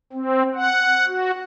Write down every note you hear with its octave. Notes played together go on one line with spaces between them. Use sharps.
C4
F#5
F#4